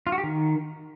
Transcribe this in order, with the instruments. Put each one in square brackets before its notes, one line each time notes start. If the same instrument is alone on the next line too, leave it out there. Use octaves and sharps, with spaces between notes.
[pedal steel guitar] F4
F#4
G4
D#3